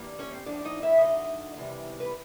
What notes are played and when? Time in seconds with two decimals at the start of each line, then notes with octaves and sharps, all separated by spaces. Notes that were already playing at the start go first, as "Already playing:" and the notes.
Already playing: G2 D#3 G3 A#3
0.19 C#4 C#5
0.33 C4 C5
0.46 A2 F3 A3 C4 D4 D5
0.65 D#4 D#5
0.83 E4 E5
1.01 F#2 D3 F#3 D#4 D#5
1.56 E2 C3 D#3 G3
2.00 B4